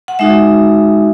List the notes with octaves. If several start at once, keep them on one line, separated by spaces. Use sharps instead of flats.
F#5
G#3 D#4 F#4 E5